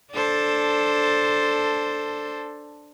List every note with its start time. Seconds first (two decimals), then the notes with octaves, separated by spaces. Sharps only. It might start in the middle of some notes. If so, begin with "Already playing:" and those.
0.12 D4 A4 C5